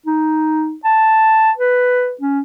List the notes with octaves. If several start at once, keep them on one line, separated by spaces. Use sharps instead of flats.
D#4
A5
B4
C#4